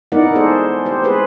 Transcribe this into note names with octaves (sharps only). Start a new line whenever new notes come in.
B3 D#4 E4 A#4 D5 F#5
G#4 A4 C5 D5
G4 C5
G#4 B4 C5